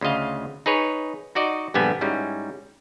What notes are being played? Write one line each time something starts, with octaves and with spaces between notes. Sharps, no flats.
D2 C#3 F4 D#5 F5
D#4 G#4 B4 C#5
D#4 F#4 D5 D#5
A#1 G2 D3 G3 B3 G#5
G#2 G3 G#3 C#4 E4 F#4